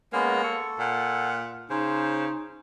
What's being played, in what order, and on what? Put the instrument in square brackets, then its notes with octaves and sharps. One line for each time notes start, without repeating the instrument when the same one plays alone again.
[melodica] G#3 B3 C#4 [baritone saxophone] A#3
[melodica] A4 [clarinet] C#6
[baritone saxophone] A#2 [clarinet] F#5
[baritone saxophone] C#3 [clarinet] D#4 [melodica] C5